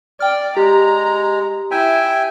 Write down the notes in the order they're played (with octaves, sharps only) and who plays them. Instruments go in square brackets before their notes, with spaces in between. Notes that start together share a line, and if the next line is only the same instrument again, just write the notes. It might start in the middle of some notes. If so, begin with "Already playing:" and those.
[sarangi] D5 [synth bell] G5 F6
[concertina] G#3 [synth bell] G4 [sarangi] A#5
[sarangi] E4 [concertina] E5 G5 G#5